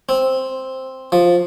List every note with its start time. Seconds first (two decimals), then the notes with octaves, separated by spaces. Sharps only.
0.09 C4
1.12 F3